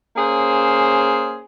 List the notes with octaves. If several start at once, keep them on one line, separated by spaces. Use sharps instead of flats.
A#3 C#4 G#4 C5